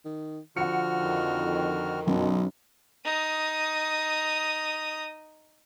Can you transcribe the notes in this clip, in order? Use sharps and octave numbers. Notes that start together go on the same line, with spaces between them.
D#3
D3 F3 F#4 F#5 F6 C#7
F2 D#3
B1 F#2 B2 D3
D#4 D#6